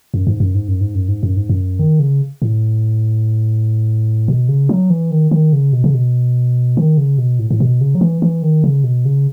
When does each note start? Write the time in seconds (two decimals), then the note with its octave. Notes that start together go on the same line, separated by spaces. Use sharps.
0.14 F#2
0.27 G#2
0.40 F#2
0.55 G#2
0.68 F#2
0.81 G#2
0.95 F#2
1.08 G#2
1.23 F#2
1.36 G#2
1.49 F#2
1.79 D#3
2.00 C#3
2.42 A2
4.28 B2
4.48 C#3
4.69 F#3
4.90 E3
5.11 D#3
5.31 D#3
5.53 C#3
5.73 B2
5.84 C#3
5.94 B2
6.77 D#3
6.98 C#3
7.18 B2
7.39 A2
7.51 A2
7.60 B2
7.81 C#3
7.95 F#3
8.01 E3
8.22 E3
8.42 D#3
8.64 C#3
8.84 B2
9.05 C#3